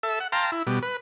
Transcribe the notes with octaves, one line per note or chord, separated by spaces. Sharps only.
A4 E5
F#5
F5 G5 A5 A#5 C6
E4
B2 G3
B4